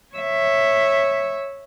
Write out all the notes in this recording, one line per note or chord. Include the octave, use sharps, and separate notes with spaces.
C#5 E5